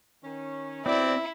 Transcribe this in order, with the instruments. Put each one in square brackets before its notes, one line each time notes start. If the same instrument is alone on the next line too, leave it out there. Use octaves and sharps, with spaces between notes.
[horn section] D#3 C#4
[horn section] B2 G4 D5 [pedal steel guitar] C4 [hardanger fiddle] E4